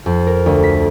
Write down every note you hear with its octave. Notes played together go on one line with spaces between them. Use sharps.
F2
A#4
D2
B6